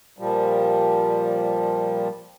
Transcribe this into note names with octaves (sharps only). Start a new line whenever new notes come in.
A#2 F3 G3